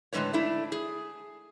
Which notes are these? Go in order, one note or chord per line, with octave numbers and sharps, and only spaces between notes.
A2 D3 G#3 C#4 B4 C#5
A3 D4 E4
G#4